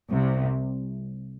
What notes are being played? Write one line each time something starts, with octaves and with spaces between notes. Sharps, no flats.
C2 C3